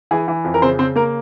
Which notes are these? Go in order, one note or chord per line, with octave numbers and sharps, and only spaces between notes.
E3 G#4
E3
F2
A#4
C#3 C4 C5
C#3 C4 C5
A#3 A#4